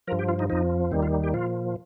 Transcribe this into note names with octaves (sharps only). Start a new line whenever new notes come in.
G2 F3 A#4
G4
F4
D#4
F2 F3 D#4
D#2 D#3 G3 C4
F4
G4
A#2 F3 F4